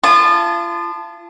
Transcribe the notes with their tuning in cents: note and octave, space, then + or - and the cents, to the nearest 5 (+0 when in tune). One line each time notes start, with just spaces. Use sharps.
F4 -35 A5 +0 D#6 -40